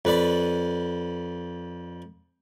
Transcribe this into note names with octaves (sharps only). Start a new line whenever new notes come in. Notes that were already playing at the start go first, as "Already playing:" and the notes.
F2 B4 D5 B5